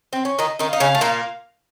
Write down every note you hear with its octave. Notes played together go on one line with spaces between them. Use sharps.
C4
C#4
D#3 D#4 D#5
D#3 D#4
D#4 F5
C#3 C#4
A3
A#2 A#3